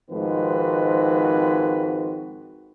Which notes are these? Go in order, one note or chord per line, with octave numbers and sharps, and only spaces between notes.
G#2 D#3 F3 C4 F#4 B4